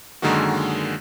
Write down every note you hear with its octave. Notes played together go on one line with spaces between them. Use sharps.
F#2 D3 D#3 G#3 A#3 F#4